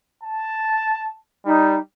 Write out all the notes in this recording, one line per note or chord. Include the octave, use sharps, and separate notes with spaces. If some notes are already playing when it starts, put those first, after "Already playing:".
A5
G3 D#4